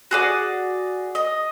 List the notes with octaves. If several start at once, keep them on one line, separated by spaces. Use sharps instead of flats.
F#4 G#4 D5
D#5